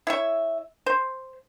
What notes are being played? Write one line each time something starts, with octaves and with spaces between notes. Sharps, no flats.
E4 C#5 E5
C5